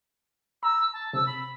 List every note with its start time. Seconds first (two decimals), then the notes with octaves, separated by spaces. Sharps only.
0.63 A#5 E6
0.93 A5
1.13 C3 E6
1.26 B5